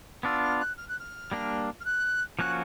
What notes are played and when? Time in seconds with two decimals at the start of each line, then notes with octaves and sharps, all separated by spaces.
0.23 B3 D4 F4 E6
0.42 F6
0.60 F#6
0.77 F6
0.88 F#6
0.99 F6
1.32 G3 A#3 D4
1.80 F6
1.85 F#6
2.39 F3 A#3 C#4 F#4 F#6